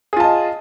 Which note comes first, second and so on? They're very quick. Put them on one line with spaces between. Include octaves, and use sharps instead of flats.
G#4 F4 A5 D#5